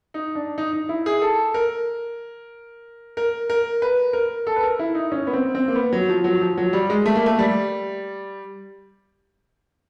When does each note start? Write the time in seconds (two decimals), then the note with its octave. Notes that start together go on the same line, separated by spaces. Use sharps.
0.14 D#4
0.35 D4
0.58 D#4
0.73 D#4
0.89 E4
1.06 G#4
1.22 A4
1.54 A#4
3.17 A#4
3.50 A#4
3.82 B4
4.13 A#4
4.47 A4
4.56 B4
4.63 A#4
4.79 E4
4.95 D#4
5.12 C#4
5.27 B3
5.33 C4
5.55 C4
5.68 A#3
5.75 B3
5.93 F#3
6.09 F3
6.24 F#3
6.41 F3
6.57 F#3
6.73 G3
6.90 G#3
7.06 A3
7.16 A#3
7.26 A3
7.39 G3